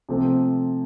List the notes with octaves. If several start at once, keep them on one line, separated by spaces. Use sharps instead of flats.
C3 F3 A3 C4